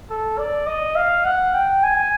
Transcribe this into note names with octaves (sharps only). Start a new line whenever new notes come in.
A4
D5
D#5
F5
F#5
G5
G#5